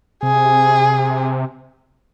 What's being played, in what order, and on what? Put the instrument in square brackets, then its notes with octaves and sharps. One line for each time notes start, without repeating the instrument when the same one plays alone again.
[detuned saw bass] C3 [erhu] G#4